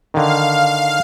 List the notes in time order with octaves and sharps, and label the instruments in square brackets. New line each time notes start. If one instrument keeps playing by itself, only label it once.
[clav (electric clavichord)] D3 D#3 [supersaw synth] F5